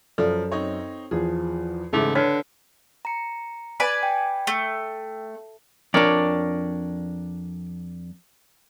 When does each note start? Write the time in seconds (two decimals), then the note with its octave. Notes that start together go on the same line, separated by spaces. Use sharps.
0.18 F#2 F3 A4 D5
0.52 C4 D#4 C#5
1.11 E2 F3 G#4
1.93 G#2 C#3 E3 G#3 A3 E4 D6
2.15 D3 B4 C#5 F6 G#6 B6
3.05 A#5 C#7
3.80 B4 D5 G#5
4.03 G5
4.47 A3
5.94 F2 D4 A#4 C#5 D5